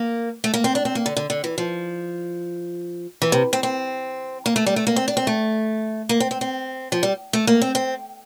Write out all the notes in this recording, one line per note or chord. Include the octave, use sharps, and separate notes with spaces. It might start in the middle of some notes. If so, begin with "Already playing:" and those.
Already playing: A#3
A3
A#3
C4
D4
C4
A#3
D3
D3
D3
E3
F3
E3
C3
C4
C4
A#3
A3
G3
A3
A#3
C4
D4
C4
A3
A#3
C4
C4
C4
F3
G3
A3
A#3
C4
C4